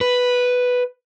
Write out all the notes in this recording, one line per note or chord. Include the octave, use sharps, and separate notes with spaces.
B4